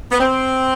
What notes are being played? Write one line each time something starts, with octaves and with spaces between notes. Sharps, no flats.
B3
C4